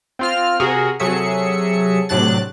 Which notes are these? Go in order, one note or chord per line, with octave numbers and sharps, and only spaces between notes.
C4 F4 F6
C3 F#4 G#4 A#4
C3 F#3 G#4 A4 E5 C#7
A2 C3 F#3 D4 F#6 A6